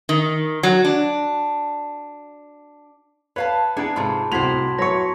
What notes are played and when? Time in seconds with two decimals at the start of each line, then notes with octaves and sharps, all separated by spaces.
0.09 D#3
0.63 F#3
0.85 D4
3.36 B4 C#5 F5 A5
3.77 B3 D4 E4 G#4 A5 A#5 D7
3.96 G#2 C3 F3 A3 B5
4.32 C2 A2 F#4 C5 C6 G#6 B6 F7
4.79 F#3 B3 E4 C#5 C#6 A#6 C#7